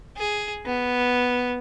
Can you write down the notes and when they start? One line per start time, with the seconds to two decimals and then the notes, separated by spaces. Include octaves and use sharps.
0.17 G#4
0.66 B3